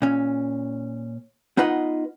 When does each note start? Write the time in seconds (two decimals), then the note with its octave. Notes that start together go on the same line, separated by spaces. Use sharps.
0.02 A#2 C#4
1.57 B3 D#4 F4 B4 D#5 F#5